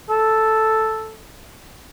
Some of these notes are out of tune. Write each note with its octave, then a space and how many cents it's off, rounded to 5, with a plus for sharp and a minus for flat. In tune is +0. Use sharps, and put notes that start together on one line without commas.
A4 +0